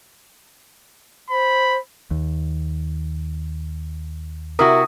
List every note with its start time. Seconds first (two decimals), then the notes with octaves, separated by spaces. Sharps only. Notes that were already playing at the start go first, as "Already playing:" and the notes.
1.30 C5 B5
2.11 D#2
4.59 C3 E4 F#4 A#4 D#6